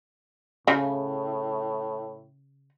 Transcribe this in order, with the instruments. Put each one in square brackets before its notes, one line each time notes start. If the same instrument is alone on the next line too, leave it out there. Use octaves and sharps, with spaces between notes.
[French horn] A2 [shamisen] C#3